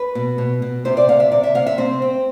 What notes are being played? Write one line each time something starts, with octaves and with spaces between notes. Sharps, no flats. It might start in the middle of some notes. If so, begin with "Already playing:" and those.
Already playing: B4
B2
B2
B2
C3 C5
D5
C3 F5
E5
C3 D5
E5
C3 F5
E5
C4 C5
C4